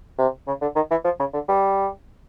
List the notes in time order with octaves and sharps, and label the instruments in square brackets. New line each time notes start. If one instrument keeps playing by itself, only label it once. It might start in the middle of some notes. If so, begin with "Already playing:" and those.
[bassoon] C3
C#3
D3
D#3
E3
F3
C#3
D3
G3